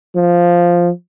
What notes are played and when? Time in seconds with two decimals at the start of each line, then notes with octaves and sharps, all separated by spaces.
0.16 F3